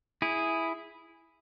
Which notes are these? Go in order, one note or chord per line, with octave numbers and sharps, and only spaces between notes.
E4 G#4